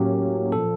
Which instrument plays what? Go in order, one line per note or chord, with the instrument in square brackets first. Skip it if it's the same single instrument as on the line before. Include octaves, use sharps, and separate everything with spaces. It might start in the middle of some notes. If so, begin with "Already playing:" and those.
Already playing: [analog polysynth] A2 F#3 A#3 C#4 [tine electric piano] G4
[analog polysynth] A#2 F3 [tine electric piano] A4